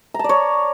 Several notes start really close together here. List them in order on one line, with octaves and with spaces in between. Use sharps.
A#5 A5 D5 C#5